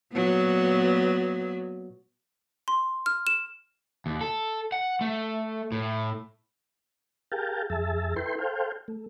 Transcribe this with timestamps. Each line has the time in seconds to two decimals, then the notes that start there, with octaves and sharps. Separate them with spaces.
0.13 A#2 F#3 B3
2.68 C6
3.06 F6
3.27 E7
4.06 D#2
4.21 A4
4.72 F#5
5.01 A3
5.72 A2
7.32 G4 G#4 A#4 F5 G5 A5
7.70 F2 G#4 E5 A5
8.16 E4 A4 B4 G5 C6
8.38 A4 C5 F5 G5
8.88 A3